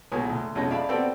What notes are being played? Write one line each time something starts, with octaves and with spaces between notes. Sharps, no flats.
B1 A#2 G#3 C#5 G#5 D#6
D2
B1 F2 G#3 C#4 D#5
D5 E5 F5 A5 B5
B3 C4 F#4 A4 D5 G5